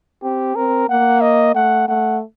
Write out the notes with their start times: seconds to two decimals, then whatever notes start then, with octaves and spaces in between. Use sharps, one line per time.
0.22 C4 G4
0.55 C4 A#4
0.89 A#3 F#5
1.21 D#5
1.55 A3 F#5
1.88 A3 F#5